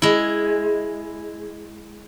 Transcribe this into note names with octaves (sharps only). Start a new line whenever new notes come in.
G#3 E4